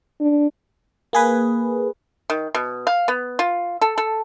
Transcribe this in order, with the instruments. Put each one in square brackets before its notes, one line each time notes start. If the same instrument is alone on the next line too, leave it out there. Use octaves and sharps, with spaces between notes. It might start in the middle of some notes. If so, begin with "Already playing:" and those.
[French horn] D4
[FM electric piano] A#3 G#4 B4
[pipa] D#3
B2
F5
B3
F4
A4
A4